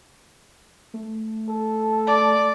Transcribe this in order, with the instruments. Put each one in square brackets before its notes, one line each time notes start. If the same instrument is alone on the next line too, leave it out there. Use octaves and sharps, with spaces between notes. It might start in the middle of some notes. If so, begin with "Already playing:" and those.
[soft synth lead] A3
[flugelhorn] A4
[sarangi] D5